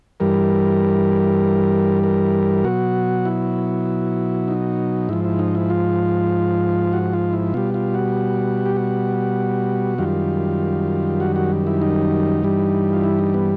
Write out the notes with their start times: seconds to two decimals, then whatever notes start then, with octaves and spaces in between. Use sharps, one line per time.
0.20 G2 E3 G3 A#4
2.03 A#4
2.64 B2 F#3 F#4
3.25 E4
4.48 D#4
5.09 G#2 F3 E4
5.25 E4
5.39 D#4
5.55 E4
5.70 F4
6.93 F#4
7.13 F4
7.33 E4
7.54 B2 G3 F4
7.74 F4
7.94 F#4
8.66 G4
8.76 F#4
9.98 F#2 D#3 G3 F4
11.20 F#4
11.36 F#4
11.67 E4
11.82 D#4
12.43 G2 E3 G3
12.93 F4
13.03 E4
13.19 D#4
13.34 B3